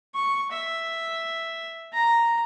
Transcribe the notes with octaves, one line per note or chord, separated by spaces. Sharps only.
C#6
E5
A#5